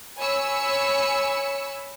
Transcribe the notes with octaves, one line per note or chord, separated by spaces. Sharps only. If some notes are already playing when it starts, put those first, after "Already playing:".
C#5 G#5 B5 E6 C#7